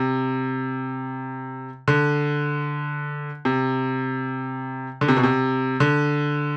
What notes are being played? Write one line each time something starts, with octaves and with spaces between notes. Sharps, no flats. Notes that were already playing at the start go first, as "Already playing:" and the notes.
Already playing: C3
D3
C3
D3
C3
B2
C3
D3